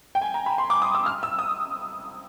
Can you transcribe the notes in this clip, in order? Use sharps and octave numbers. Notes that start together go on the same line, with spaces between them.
G5
G#5
A#5
B5
C6
D6
D#6
E6
F6
E6
D#6